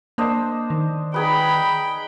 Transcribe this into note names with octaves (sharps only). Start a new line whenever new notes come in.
A#3 D4 C5 D#5
D#3
D#4 G#4 B4 G5 B5